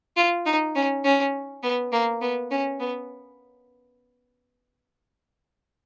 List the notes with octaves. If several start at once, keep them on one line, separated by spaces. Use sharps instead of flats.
F4
D#4
C#4
C#4
B3
A#3
B3
C#4
B3